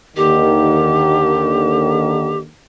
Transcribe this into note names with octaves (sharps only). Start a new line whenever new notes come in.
D#2 D3 D#3 G4